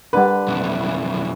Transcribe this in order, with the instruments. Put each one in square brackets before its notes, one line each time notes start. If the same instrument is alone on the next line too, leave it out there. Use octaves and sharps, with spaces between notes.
[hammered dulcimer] D3 [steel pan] G3 D4 A#4 [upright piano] B4
[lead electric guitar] B1 F2 [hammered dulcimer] E4